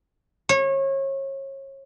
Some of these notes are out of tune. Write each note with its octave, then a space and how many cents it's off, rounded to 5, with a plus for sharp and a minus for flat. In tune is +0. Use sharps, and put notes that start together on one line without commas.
C#5 -30